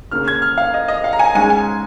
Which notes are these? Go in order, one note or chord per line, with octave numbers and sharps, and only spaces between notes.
C#3 A#3 C#4 F6
G#6
F6
F5
D#5
D#5
F5
A#5
G#5
G#2 G#3 C#4 G#5
G#5